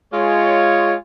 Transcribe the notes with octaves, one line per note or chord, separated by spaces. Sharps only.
G#3 F4 C#5